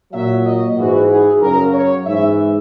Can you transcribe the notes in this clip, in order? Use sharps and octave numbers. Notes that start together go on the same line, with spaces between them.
A#2 F#3 E5
D#5
G#2 E3 F#4
G#4
F#2 C#3 F#3 A#4
C#5
G#2 E3 E5